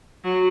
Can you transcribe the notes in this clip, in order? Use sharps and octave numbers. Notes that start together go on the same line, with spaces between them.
F#3